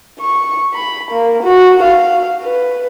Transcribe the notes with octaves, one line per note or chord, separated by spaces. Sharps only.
C#6
B5
A#3
F#4
F5
B4